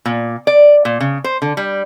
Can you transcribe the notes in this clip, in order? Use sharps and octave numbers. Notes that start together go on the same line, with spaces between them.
A#2
D5
A#2
C#3
C5
D3
G3